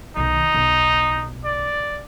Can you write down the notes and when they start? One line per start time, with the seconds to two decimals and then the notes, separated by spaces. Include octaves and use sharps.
0.17 B1 D#3 D#4
0.54 B1
1.45 D5